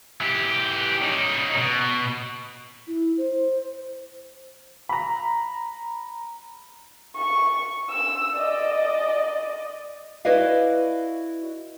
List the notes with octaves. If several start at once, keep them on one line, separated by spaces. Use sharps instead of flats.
E3 G4
C#3 D#4
B2
E4
C5
A#5 B5
C#6
E6
D5 D#5
E4 F#4 B4 D5 D#5 F5